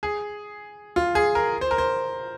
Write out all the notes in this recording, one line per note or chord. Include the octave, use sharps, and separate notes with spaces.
G#4
F4
G#4
A#4
C5
A#4
C5